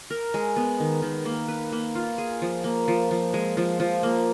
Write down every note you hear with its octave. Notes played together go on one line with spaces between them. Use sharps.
A#4
G#3
B3
D#3
D#3
A#3
B4
A#3
F4
G#4
F3
A#3
F3
F3
G#3
F3
F3
A#3